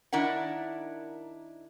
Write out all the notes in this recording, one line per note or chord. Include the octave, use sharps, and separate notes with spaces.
D#3 D4 E4 A#4 F#5